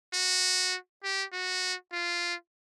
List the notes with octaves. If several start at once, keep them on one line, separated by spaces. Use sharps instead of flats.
F#4
G4
F#4
F4